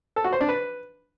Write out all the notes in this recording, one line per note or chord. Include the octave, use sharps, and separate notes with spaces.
A4
F#4
C5
D4
B4